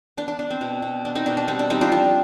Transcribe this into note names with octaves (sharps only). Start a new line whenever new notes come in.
B3 D4
D4
B3 D4
C4
B2
B2
B3 D4
C4 D#4
B2 D4
D4
G3 C4
D4
G3 C4 D#4
D4 F4
F3 D4